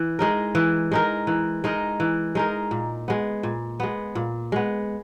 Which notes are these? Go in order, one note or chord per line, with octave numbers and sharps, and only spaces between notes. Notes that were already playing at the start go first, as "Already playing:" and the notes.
Already playing: E3
G#3 D#4 A#4
E3
G#3 D#4 A#4
E3
G#3 D#4 A#4
E3
G#3 D#4 A#4
A#2
G#3 B3
A#2
G#3 B3
A#2
G#3 B3